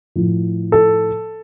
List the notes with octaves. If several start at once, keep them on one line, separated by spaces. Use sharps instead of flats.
A2 F3
A4